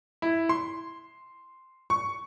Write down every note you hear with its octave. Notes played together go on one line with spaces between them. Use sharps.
E4
C6
C#6